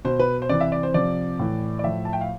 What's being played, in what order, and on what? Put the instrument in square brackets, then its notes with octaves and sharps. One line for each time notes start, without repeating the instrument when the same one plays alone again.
[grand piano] B2 C5
B4
C5
C3 E3 D5
E5
D5
C5
C3 F3 D5
A2 E3
D5
A2 F3 E5
A5
G5
F5